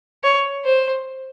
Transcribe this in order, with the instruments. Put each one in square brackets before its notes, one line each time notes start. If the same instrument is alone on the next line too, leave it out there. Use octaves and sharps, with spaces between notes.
[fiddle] C#5
C5